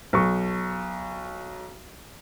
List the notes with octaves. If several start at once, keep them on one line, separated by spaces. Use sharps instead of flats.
B1 C#6